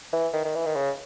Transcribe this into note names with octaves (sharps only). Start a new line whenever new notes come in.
E3
D#3
D#3
E3
D#3
C#3